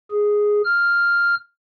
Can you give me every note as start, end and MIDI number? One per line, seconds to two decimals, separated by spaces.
0.11 0.62 68
0.65 1.35 89